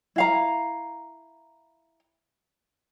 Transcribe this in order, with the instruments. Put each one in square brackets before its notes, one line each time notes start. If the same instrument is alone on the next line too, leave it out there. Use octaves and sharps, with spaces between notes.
[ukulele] E4 F5 A#5